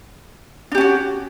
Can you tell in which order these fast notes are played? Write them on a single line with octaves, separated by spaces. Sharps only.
D4 G4 C#4 F#4